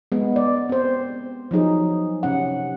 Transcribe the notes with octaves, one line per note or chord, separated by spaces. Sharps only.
G#3 B3
D5
C4 C5
F3 F#3 D#4 G#4
C3 C#4 F#5